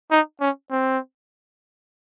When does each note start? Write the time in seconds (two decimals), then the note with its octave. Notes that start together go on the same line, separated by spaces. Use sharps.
0.11 D#4
0.41 C#4
0.71 C4